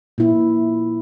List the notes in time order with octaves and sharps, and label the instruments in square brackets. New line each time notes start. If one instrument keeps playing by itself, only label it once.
[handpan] A#2 E4